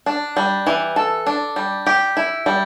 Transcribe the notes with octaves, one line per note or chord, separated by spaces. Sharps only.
D4
G3
E3
A4
D4
G3
G4
E4
G3